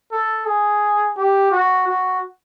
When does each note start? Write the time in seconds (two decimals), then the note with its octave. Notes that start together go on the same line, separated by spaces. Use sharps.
0.11 A4
0.46 G#4
1.17 G4
1.51 F#4
1.87 F#4